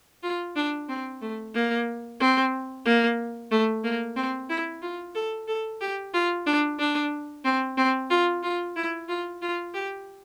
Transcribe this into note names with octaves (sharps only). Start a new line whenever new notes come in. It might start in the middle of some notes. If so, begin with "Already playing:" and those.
F4
D4
C4
A3
A#3
C4
A#3
A3
A#3
C4
E4
F4
A4
A4
G4
F4
D4
D4
C4
C4
F4
F4
E4
F4
F4
G4